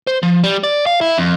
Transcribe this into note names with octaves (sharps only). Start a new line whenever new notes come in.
C5
F3
G3
D5
F5
E4
F2